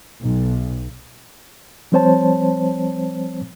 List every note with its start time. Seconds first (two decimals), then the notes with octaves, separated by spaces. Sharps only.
0.20 B1
1.92 F3 G3 C4 C5 C#5 A5